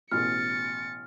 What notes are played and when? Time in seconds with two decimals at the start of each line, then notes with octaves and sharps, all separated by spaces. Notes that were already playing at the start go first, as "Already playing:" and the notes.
0.11 A1 B2 F6 A6 C#7